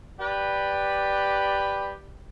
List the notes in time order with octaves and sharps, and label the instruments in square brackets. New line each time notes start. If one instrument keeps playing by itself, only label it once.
[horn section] G4 B4 D5